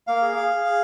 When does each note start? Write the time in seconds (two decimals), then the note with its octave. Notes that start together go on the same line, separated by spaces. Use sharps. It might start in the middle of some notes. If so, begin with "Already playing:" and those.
0.07 A#3 F5
0.22 G#4
0.36 G#4
0.50 G#4
0.65 G#4